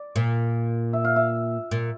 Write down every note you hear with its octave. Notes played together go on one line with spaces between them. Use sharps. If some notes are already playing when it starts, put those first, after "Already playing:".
Already playing: D5
A#2
E5
F5
E5
A#2